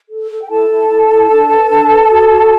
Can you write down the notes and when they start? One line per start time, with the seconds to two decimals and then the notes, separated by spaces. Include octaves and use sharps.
0.10 A4
0.31 A4
0.42 G5
0.50 E4 A4 A5
0.70 E4
0.89 E4
1.10 E4
1.30 D4
1.50 B4
1.70 D4
1.90 B4
2.10 F#4
2.29 F#4